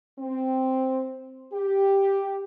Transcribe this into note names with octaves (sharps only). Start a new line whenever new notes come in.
C4
G4